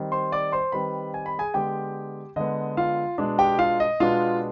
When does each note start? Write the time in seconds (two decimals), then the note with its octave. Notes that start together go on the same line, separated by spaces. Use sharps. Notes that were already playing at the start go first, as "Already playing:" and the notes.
Already playing: D#3 G3 C4
0.12 C5 C6
0.32 D5 D6
0.52 C5 C6
0.72 D#3 G3 C4 B4 B5
1.14 G#5
1.26 B5
1.39 G#4 G#5
1.54 D3 G#3 B3 G4 G5
2.36 D3 G#3 B3 D#5
2.77 F4 F5
3.18 B2 G#3 B3 D4
3.39 G4 G5
3.58 F4 F5
3.80 D#5
4.00 B2 G#3 B3 D4 F4 F5